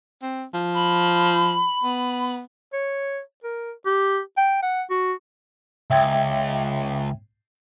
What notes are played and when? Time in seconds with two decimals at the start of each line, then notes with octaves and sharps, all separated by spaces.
0.22 C4
0.54 F3
0.74 B5
1.83 B3
2.73 C#5
3.44 A#4
3.85 G4
4.37 G5
4.62 F#5
4.90 F#4
5.91 C#2 E5 G5 G#6